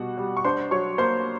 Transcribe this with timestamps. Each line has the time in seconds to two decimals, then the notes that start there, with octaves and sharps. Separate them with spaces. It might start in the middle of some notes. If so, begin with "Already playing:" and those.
Already playing: B2 G3 F#4 F#5
0.18 G3
0.37 C#6
0.45 D4 C5 C6
0.71 F#3 C#5 C#6
0.98 A#3 C5 C6